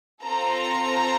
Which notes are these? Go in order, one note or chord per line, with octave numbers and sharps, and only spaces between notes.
C4 F4 A4 A#5